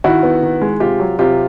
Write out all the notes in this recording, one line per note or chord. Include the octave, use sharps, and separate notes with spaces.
D#3 E4 F#4
B3
D#3
G#3
C3 F4 G4
F#3
C3 F4 G4